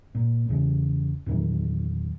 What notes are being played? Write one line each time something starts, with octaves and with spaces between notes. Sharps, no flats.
A#2
E2 C#3
E2 A#2 D#3 F#3